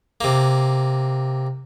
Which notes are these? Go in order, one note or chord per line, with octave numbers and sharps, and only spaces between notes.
C3 A#3